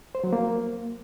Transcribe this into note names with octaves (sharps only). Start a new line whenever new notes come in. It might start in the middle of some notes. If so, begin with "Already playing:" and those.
C5
F#3
A#3